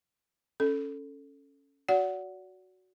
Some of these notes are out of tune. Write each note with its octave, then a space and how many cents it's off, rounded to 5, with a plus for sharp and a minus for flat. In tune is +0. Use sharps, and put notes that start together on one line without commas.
C#4 +0 A4 +5
F#4 +0 D5 -40 F#5 +0